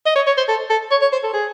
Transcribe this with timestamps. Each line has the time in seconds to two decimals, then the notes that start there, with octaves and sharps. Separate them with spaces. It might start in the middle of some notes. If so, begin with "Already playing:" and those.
0.06 D#5
0.16 C#5
0.27 C#5
0.38 C5
0.48 A4
0.70 A4
0.91 C#5
1.02 C#5
1.13 C5
1.24 A4
1.34 G#4